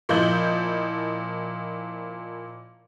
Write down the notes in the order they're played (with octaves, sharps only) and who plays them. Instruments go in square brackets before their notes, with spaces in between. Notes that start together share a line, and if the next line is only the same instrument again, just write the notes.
[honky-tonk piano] A#2 F3 E4 D#5 G6 F#7